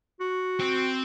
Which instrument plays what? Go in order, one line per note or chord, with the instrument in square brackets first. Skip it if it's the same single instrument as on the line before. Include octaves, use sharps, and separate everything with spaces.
[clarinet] F#4
[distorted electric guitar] C4